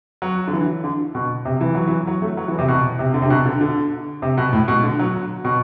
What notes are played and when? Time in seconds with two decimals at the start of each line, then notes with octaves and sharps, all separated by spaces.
0.22 F#3
0.47 D3
0.53 E3
0.84 D3
1.15 B2
1.45 C3
1.61 E3
1.75 F#3
1.87 E3
2.07 F#3
2.22 A3
2.37 F#3
2.48 E3
2.59 C3
2.68 B2
2.99 C3
3.14 D3
3.22 C3
3.30 B2
3.46 D3
3.61 D3
4.22 C3
4.38 B2
4.53 A2
4.68 B2
4.83 D3
4.99 F#3
5.45 B2